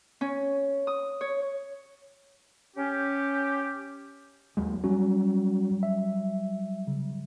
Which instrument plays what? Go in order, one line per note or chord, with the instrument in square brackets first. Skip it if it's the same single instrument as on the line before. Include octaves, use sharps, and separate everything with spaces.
[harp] C#4
D#6
C#5
[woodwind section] C#4 G4
[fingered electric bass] D#2 F#3 G#3
[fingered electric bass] F#3 G3 [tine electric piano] C#4 F#4
[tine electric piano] E5
C#3